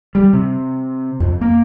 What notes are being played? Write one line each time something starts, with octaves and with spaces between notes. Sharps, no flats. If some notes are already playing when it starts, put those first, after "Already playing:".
G3
C3
F2
A#3